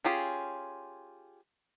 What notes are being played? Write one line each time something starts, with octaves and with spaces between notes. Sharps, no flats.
C#4 F4 G4 G#4